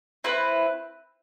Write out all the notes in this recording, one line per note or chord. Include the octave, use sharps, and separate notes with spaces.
C4 E4 B4